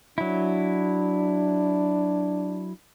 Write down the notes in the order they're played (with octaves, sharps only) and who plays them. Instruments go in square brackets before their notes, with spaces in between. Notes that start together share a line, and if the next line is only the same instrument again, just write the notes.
[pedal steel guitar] F#3 E4 [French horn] D4